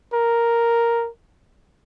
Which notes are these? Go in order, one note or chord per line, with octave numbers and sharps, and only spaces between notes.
A#4